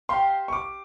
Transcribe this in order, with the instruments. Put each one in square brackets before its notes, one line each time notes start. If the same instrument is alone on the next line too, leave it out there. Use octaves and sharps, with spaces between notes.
[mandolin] G4 C5 F5 [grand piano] C6
[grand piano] C#6
D6